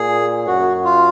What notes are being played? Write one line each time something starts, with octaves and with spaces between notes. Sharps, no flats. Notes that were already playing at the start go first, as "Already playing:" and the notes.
Already playing: A#2 G#4
F#2 F#4
F4